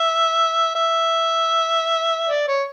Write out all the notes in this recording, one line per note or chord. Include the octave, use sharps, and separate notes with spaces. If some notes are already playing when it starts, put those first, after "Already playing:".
Already playing: E5
E5
D5
C#5